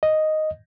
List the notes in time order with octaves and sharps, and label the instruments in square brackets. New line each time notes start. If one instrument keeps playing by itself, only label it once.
[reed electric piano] D#5